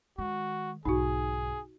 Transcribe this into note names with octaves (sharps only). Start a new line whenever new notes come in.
D#3 G#3 F#4
B1 G#2 D#4 F#4 G#4